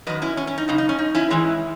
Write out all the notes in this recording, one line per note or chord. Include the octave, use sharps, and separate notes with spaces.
F#2 D#3 F#3 B4 D#5
C#4 E4
C#4
C#4
D#4
F#2 C#3 D#4
D#4
C#4
D#4
C#4 E4
G#2 E3 G#3 C#4